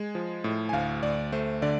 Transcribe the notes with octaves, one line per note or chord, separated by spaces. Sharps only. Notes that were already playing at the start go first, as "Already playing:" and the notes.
Already playing: G#3 G#5
F3
A2
G#5
D2 F5
D2 D5
A3 C5
D3 D5